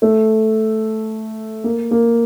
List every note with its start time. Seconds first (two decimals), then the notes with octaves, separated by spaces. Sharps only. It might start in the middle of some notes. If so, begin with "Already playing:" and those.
0.02 A3
1.64 A#3
1.91 A#3